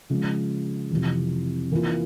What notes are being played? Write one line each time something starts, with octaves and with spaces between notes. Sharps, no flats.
C#3 F3 G#3
F2 C3 E3
E3 A#3 F4